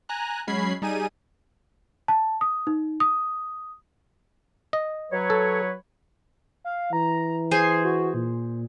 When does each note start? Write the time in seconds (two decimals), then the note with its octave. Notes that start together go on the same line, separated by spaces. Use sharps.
0.09 G#5 A#5 F#6
0.47 F#3 G#3 C#4 B5 G#6 C7
0.82 G3 D#4 G#4 G#5 D#7
2.08 A5
2.41 D#6
2.67 D#4
3.00 D#6
4.73 D#5
5.11 F#3 B4 C#5
5.30 A4
6.64 F5
6.93 E3 A#5
7.51 G#4 C5 G#5 C7
7.84 F#4
8.14 A#2